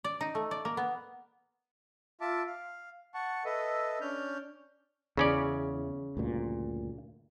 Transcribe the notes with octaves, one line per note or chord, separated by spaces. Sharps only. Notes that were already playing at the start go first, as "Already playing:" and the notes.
D5
D#4
A3
D5
A#3
B3
F4 E5 A5 D6
F5
F#5 A5 C#6
A4 B4 D#5 E5
C#4 D4 F6 G6
E2 C#3 C#4 D5
D2 G2 A#2